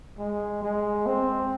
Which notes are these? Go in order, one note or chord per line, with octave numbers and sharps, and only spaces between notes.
G#3
G#3
C4